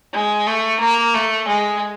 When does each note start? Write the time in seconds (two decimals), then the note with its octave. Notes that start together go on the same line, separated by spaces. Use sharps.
0.13 G#3
0.47 A3
0.80 A#3
1.14 A3
1.48 G#3